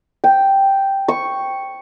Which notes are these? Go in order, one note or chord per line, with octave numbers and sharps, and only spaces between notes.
G5
C#6